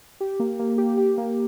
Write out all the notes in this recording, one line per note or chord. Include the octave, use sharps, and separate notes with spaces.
G4
A#3
A#3
G4
G4
A#3